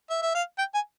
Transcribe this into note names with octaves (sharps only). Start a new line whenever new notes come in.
E5
E5
F5
G5
G#5